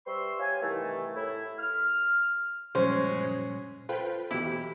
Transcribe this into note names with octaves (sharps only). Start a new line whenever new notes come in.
G3 B4 C5 E5 C6 C#6
G4 C#5 F5 G#5
C2 D#3 E3 A3
A2 E4
F6
F#2 A#2 C#3 F3 G3 G#3 C#4 C5
F4 A4 B4 C5 G5
B1 E2 E4 G4